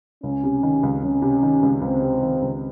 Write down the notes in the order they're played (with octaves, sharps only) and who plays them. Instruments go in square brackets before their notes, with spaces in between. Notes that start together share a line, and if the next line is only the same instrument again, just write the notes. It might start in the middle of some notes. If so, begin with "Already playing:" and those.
[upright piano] C#2 [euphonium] C#4
[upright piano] C3
D#3
C#2
[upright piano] C#2 [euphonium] C#4
[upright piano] C3
D#3
C#2
[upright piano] C#2 [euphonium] C4
[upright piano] C3
D#3
C#2